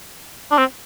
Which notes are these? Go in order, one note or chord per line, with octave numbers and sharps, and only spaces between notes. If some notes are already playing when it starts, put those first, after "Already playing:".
D4
C4